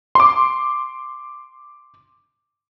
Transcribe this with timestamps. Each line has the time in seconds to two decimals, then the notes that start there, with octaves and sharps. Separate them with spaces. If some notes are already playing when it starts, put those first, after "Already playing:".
0.15 C6 D6